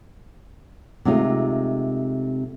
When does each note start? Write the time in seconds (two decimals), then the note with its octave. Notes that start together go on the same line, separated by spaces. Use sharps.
1.05 C3 G#3 A3 D#4 F4